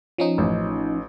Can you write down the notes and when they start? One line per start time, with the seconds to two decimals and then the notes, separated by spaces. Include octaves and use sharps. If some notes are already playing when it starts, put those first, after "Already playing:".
0.18 F3 C#4 D#4
0.38 A1